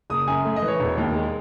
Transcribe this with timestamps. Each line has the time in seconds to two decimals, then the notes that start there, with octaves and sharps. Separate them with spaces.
0.10 F#1 D#6
0.27 F#2 G#5
0.45 A3
0.56 D#5
0.62 E3
0.68 C#5
0.80 E1
0.98 D#2
1.14 G#3